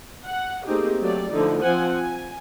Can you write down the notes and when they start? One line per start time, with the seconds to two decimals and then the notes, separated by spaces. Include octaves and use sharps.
0.25 F#5
0.66 A3 A#3 C4 D#4 G4 G#4
1.00 F#3 A3 G4 D5
1.32 D3 F3 A3 D#4 E4
1.61 F3 C4 F4 C5 F#5 G#5
1.92 G#5